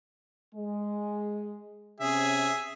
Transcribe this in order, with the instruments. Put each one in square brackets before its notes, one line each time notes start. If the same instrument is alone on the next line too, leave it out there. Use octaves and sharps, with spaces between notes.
[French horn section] G#3
[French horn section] C3 C#4 [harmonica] G#4 E5